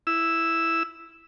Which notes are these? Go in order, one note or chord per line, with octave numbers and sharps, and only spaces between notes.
E4 E6